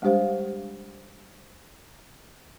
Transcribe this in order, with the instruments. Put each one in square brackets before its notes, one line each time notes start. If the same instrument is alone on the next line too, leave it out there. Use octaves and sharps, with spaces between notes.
[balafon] G3 G#3 D4 G4 C5 F5